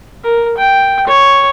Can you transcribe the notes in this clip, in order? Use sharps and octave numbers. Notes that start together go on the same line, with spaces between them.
A#4
G5
C#5